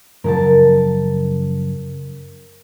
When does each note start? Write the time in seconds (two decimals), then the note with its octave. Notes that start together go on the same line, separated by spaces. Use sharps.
0.24 F#2 C#3 F3 A#4 A5